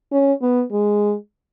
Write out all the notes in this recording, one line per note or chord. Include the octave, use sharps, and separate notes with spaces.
C#4
B3
G#3